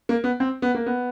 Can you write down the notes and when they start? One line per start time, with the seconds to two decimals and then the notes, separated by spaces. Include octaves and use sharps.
0.09 A#3
0.24 B3
0.40 C4
0.62 B3
0.75 A#3
0.86 B3